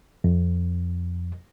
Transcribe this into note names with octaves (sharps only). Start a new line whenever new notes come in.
F2